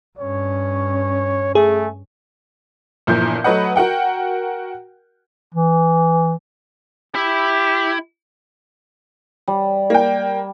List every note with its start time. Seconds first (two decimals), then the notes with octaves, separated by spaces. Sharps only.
0.19 G2 C#4 C#5
1.55 A3 G#4
3.07 G1 A#2 E3 F3 G6
3.44 F#3 A3 B4 D#5 F#5
3.76 F#4 A#4 F#5 G5
5.55 E3
7.15 E4 G4
9.48 G3
9.90 A#3 G5